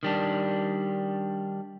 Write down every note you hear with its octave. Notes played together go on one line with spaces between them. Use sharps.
D#3 G3 D4